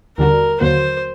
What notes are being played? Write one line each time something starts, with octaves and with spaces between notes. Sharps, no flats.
D#2 D3 G3 D4 F#4 A#4
D#2 D3 F#3 A#3 F#4 C5